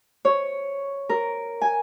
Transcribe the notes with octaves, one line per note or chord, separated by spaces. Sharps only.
C#5
A#4
G#5